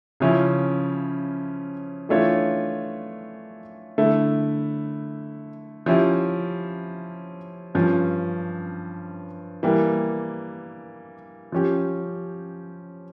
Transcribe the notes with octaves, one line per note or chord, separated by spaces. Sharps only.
C#3 F3 C#4 E4
E3 A3 D4 F4 C#5
D3 A3 E4
F3 C#4 E4 G4
G2 F3 C#4
E3 G3 A#3
F3 C#4 G4